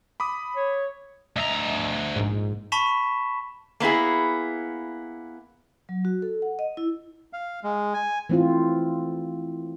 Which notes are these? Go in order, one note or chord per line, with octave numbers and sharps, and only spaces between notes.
B5 D6 D#6
C#5
D2 D#5 E5 A#5
A#1 G#2
A5 B5 C#6 B6 E7
A#3 B3 E4 G#4
F#3
F#4
A4
F#5
D#5
E4
F5
G#3
G#5
E3 A3 C4 E4 F4